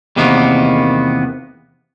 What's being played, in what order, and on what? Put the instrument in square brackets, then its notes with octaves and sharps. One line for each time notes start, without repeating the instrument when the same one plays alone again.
[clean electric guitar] E2 C3 D#3 A#3 B3